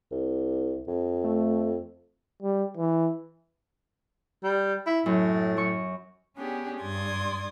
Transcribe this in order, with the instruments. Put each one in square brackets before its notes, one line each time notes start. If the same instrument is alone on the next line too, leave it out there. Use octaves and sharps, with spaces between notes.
[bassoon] C2
F2
[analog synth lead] A3
[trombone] G3
E3
[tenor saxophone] G3
E4
[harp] F#2 [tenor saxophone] A2
[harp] F#2 C#6
[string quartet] B3 C#4 D4 G4 G#4
G2 D5 C6 D#6 G#6